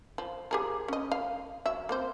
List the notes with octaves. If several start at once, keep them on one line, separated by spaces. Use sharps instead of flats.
F3
G4 G#4 A#4
C#4 D#5
F5
F#3 E5
A#3 C4 C5